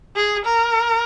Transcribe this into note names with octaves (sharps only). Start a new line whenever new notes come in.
G#4
A#4